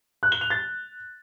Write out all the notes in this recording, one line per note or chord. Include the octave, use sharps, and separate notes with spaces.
F#6
G7
F7
A6